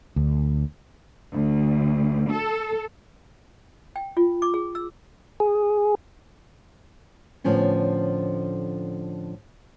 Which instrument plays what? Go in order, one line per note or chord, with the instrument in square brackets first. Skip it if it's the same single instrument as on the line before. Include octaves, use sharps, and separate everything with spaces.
[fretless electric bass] D2
[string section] D2
A4
[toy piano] G5
F4
D6
G#4
E6
[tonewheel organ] G#4
[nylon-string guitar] A2 D3 F3 B3 C#4